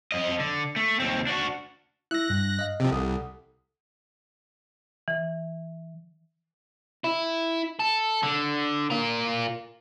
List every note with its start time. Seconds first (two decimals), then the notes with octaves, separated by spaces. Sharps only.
0.12 F2 D#5
0.40 D3
0.76 A3
1.00 D#2 C4
1.27 D4 F#4
2.11 E4 E5 E6 F#6 A#6
2.30 G2
2.59 D#5 F5
2.80 C3 F3
2.92 C2 A4 F#5 D#6
5.08 E3
7.04 E4
7.79 A4
8.23 D3
8.90 F4 A#4